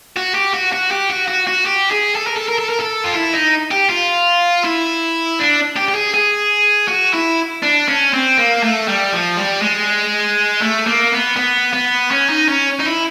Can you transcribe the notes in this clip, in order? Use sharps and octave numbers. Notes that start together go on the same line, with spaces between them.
F#4
G4
F#4
F#4
G4
F#4
F#4
F#4
G4
G#4
A4
A#4
A4
A#4
A4
A#4
A4
F4
E4
D#4
G4
F4
E4
D4
G4
G4
G#4
G#4
F#4
E4
D4
C#4
C4
A#3
A3
G3
F3
G3
G#3
A3
A#3
B3
B3
B3
C#4
D#4
C#4
D#4
E4